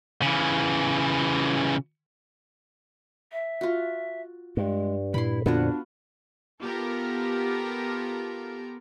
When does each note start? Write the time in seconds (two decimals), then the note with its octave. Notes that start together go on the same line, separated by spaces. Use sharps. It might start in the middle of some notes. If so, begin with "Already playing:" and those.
0.22 C#3 E3
3.32 E5
3.61 F4 F#4
4.57 G2 G#3
5.14 A#2 E4 B5 C6
5.46 F2 D3 B3 D4 F4 F#4
6.61 B3 F4 G4 A4 A#4